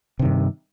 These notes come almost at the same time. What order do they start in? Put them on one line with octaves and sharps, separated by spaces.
C3 D#3 G2